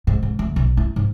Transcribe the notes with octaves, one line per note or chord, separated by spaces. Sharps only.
G#2
G#2
D2
B1
E4
G#2